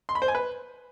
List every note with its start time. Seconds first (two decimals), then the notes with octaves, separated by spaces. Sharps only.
0.09 C6
0.15 B5
0.22 C5
0.28 G#5
0.35 B4